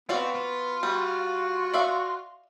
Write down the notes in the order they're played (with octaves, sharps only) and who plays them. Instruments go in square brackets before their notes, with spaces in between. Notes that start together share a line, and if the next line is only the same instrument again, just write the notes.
[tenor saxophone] B3 [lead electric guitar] C4 [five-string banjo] F#4 D5 F5
[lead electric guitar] F4
[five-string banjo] G3 [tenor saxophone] F#4
[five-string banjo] D5 E5 F5